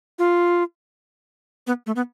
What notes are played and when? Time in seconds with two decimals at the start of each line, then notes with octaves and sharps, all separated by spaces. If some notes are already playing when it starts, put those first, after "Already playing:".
0.19 F4
1.67 B3
1.87 A3
1.96 B3